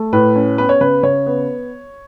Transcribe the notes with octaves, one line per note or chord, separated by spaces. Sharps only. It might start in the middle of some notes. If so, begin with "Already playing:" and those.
Already playing: A3
A2 B4
C#4
B3 B4
C#5
C#3 B4
C#3 C#5
B3